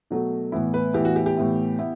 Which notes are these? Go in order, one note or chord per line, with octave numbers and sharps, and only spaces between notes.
B2 F#3 A3
A2 E3 B3 E4
B4
A2 E3 B3 E4 G4
F#4
G4
G4
A2 E3 B3 E4
B3 E4